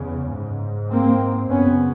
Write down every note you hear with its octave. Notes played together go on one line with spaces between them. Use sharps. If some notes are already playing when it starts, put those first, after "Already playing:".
Already playing: E2 C#3
G#2
A#3 C4
F#2 C#3 B3 C#4